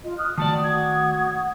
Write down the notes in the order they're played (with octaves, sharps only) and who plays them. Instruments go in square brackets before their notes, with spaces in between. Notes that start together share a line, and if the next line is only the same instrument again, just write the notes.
[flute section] F4 D#5
D#6 F6 F#6
[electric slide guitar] D#3 A3 D5 [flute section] F#4 D#6 [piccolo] A5
[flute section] F#4 F#5 D#6 [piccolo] G#6